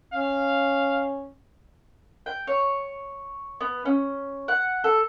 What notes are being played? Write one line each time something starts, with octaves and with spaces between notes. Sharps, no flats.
C#4 F5
G5
C#5
B3
C#4
F#5
A4